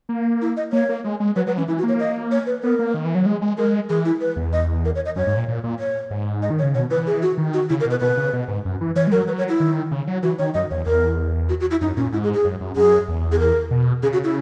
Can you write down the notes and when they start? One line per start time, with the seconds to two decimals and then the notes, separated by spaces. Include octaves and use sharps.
0.09 A#3
0.42 E4
0.57 D#5
0.73 A#3 C#5
0.89 A#3
1.04 G#3
1.20 G#3
1.36 F#3 B4
1.47 F#3 B4
1.57 E3 C#4
1.68 E3 E4
1.78 F#4
1.83 A#3
1.88 C#5
2.00 D#5
2.31 C#5
2.46 B4
2.63 B3 A#4
2.79 A#3
2.94 D#3
3.05 E3
3.15 F#3
3.26 G#3
3.42 G#3
3.58 G#3 A#4
3.89 E3 G#4
4.05 E4
4.21 B4
4.36 E2
4.53 D#5
4.85 A#4
4.95 C#5
5.06 D#5
5.16 F#2 C#5
5.27 G#2
5.37 A#2
5.48 A#2
5.64 A#2
5.79 C#5
6.11 G#2
6.42 D#5
6.50 D#3
6.59 C#5
6.63 C#3
6.75 B2 C#5
6.91 E3 B4
7.07 G#4
7.22 F#4
7.38 D#3
7.53 F#4
7.69 C#3 E4
7.80 A#4
7.86 B2 B4
8.01 B2 B4
8.17 C#3
8.33 B2
8.48 G#2
8.65 F#2
8.81 E3
8.96 E3 C#5
9.07 G#3
9.12 F#3 A#4
9.28 F#3 B4
9.38 C#5
9.49 E4
9.60 D#3
9.91 C#3
10.07 F#3
10.23 E3 F#4
10.39 D#3 C#5
10.54 F#2 D#5
10.70 E2 C#5
10.86 E2 A#4
11.49 F#4
11.60 F#4
11.71 E4
11.81 F#2 D#4
11.97 A#2 C#4
12.12 G#2 E4
12.24 G#4
12.34 G#4
12.45 F#2
12.61 F#2
12.76 F#2 G#4
13.08 E2
13.32 G#4
13.39 A#4
13.71 B2
14.03 C#3 G#4
14.13 F#4
14.24 E4